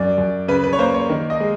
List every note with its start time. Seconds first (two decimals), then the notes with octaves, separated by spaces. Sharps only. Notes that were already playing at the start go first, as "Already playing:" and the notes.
Already playing: F#2 D5
0.18 F#2
0.48 C#3 B4
0.64 B4
0.73 C#5
0.79 A#3 C5
0.94 C#5
1.09 D#3
1.30 D#5
1.40 G#3